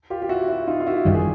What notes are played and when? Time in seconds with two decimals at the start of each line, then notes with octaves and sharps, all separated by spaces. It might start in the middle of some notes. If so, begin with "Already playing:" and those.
0.10 F4 G4
0.22 G4
0.29 E4 F#4
0.48 E4 F#4
0.67 D#4 F4
0.80 F4
0.87 E4 F#4
1.05 F#2 D#3 G3 G4
1.14 G#4